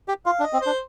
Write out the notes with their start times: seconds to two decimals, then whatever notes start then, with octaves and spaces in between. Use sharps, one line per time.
0.08 G4
0.26 F4 F5
0.40 D4
0.44 D#5
0.53 C4
0.61 D4 C5